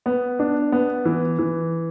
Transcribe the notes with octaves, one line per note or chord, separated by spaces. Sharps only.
B3
D4
B3
E3
E3